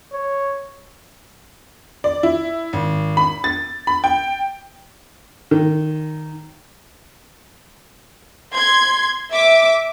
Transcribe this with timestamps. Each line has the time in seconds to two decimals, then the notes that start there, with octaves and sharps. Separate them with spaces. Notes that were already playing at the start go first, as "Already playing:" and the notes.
0.13 C#5
2.04 D5
2.23 E4
2.73 G#1
3.17 B5
3.44 A6
3.87 B5
4.04 G5
5.51 D#3
8.55 C6 G#6
9.31 E5 D6